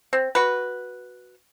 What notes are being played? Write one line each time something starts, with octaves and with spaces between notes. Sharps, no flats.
C4
F#4 B4